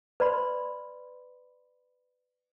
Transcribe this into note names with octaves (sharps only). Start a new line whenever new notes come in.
B4 D5 B5 C6